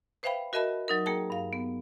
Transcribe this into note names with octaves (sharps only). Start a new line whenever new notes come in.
B4 C5 E5 F5 G5 B5
F#4 A#4 D#5 E5 A5 B5
F#3 D#4 A#4
A#3 G#4 A#4 G5 A5
G2 F5
B3